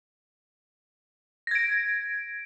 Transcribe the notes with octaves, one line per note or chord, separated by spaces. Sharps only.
G#6 A#6 D7